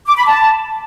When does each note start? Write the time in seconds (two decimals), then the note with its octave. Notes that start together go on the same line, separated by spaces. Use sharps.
0.06 D6
0.16 B5
0.27 A5